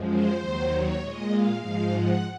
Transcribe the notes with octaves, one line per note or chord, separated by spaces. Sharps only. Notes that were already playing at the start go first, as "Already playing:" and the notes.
Already playing: F#2 F3 G#3
C5
D#2 D#3 F#3
C#5
A#2 G#3 D#5
F5
G#2 F3 G#3 F5
F#5